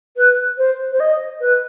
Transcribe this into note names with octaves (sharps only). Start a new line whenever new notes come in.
B4
C5
C5
D#5
B4